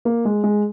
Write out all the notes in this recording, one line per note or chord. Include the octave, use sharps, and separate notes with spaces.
A#3
G#3
G#3